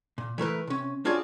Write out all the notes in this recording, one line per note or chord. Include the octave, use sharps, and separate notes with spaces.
A#2
E3 A3 A#4 B4
C3 C#4
D4 F4 F#4 G#4 C#5 D5